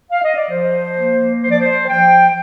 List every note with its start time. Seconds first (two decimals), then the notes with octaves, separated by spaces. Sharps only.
0.11 F5
0.24 D#5
0.37 D5
0.50 F3 C5
0.96 A#3
1.42 F3 C5
1.51 D5
1.61 C5
1.88 F3 G5